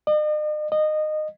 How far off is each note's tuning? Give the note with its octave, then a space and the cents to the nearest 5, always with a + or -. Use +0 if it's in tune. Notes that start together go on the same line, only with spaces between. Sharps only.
D#5 -45
D#5 -20